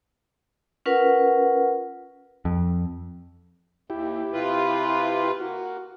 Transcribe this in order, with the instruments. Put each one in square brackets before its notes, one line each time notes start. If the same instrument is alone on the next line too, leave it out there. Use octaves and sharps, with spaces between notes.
[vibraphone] C#4 F4 A#4 B4 F#5
[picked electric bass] F2
[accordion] D#2 [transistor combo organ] E4 G4
[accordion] C3 F4 B4
[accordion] A#3 [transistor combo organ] F#4